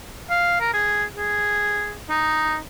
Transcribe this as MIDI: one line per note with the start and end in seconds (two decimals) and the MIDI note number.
0.30 0.60 77
0.61 0.69 70
0.74 1.04 68
1.15 1.95 68
2.10 2.57 63